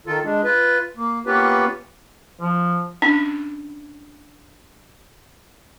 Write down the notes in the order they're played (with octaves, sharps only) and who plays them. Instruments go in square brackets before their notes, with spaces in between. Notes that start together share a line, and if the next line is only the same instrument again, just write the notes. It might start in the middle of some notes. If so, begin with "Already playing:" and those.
[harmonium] D#3 F4 A4
G#3 D4
F4 B4
A#3
A#3 B3 C#4 F4 G4 B4
[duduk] F3
[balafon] C#4 D4